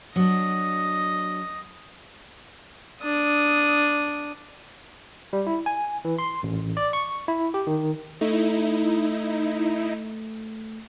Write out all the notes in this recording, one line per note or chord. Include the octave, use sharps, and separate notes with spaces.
F#3 D4 D#5
D4 D#6
G3
E4
G#5
E3
C6
A1
D5
C#6
E4
G4
D#3
A3 D#4 E4